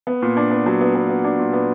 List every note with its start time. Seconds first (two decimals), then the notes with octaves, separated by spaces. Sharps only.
0.07 B3
0.22 A#2
0.37 D4
0.51 B3
0.66 F#3
0.81 B3
0.95 B3
1.09 B3
1.24 D4
1.40 A#2
1.53 B3